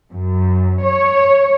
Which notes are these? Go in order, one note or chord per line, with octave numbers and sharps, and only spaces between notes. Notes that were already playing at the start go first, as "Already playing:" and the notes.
F#2
C#5